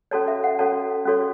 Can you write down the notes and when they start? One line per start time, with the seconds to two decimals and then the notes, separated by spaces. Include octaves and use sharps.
0.11 C#4 F#4 A4 C#5 A5
0.28 E5
0.44 F#5
0.59 C#4 F#4 A4 C#5 A5
1.06 C#4 F#4 A4 C#5